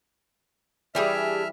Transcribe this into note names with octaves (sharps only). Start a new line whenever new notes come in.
E3 G3 D4 G4 G#4 E5 F6